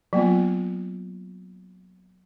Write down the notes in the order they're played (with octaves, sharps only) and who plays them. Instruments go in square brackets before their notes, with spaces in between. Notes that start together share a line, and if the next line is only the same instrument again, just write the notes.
[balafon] F#3 A#3 B3 F4